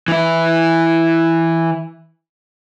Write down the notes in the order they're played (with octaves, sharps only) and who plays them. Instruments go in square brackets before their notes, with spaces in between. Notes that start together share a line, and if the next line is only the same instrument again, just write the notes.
[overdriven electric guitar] E3 E4